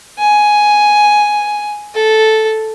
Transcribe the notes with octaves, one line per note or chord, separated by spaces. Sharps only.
G#5
A4